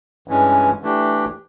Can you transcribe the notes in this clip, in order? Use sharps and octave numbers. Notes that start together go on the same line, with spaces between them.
G2 E3 G#3 C#4
E3 A3 D4 G4